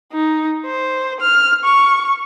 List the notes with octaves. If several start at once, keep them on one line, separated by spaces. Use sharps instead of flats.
D#4
C5
F6
C#6